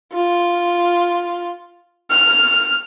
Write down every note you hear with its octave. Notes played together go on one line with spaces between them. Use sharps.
F4
F6